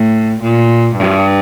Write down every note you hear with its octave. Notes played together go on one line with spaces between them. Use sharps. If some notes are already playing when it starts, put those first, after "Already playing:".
Already playing: A2
A#2
G2